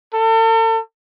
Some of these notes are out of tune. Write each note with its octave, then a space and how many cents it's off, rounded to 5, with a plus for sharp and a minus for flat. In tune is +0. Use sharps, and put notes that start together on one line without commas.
A4 +40